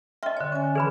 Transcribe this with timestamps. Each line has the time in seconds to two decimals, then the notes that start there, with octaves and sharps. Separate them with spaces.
0.23 D#5 E5 G5 C6 F6
0.37 D3 C#5
0.52 C#4 G#5
0.75 E3 G#4 B4 B5